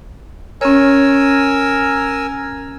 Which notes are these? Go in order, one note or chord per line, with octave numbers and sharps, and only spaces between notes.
C#4 A#4 C#5 G#5 E6